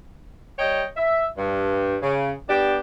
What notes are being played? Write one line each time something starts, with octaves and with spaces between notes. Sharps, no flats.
G3 C#5 D#5 G5
E5
G2
C#3
B3 D4 G4